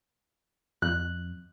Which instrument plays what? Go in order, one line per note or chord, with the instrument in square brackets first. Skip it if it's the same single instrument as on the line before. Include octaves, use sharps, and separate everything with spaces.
[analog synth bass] F2 [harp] F#6